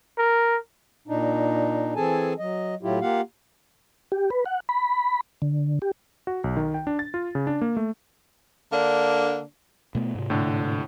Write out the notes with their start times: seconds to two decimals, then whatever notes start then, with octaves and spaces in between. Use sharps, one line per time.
0.18 A#4
1.08 A#2 D4 D#4
1.96 E3 C4 G#4 A4 G#5 A5
2.39 F#3 D#5
2.82 A2 F#3 E4 F4 G4
3.01 A#3 F4 G4 F5 F#5
4.12 G4
4.30 B4
4.46 F#5
4.69 B5
5.42 D3
5.82 G4
6.27 F#4
6.44 B1
6.57 D#3
6.74 G5
6.87 D4
6.99 A6
7.14 F4
7.35 C#3
7.47 D4
7.61 A#3
7.77 A3
8.72 D3 A#3 D4
9.95 B2 A3 B3
10.15 G#2 C3
10.30 A2 D3